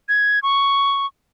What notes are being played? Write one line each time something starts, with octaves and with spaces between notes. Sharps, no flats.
G#6
C#6